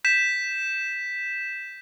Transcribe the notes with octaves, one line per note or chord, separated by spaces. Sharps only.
G6 B6 E7